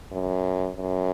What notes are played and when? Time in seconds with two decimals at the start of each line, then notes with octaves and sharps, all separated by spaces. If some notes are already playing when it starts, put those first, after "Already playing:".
0.12 F#2
0.76 F#2